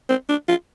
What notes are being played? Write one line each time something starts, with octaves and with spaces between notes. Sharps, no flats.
C4
D4
F4